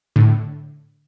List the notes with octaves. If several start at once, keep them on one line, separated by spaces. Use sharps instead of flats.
A2 D3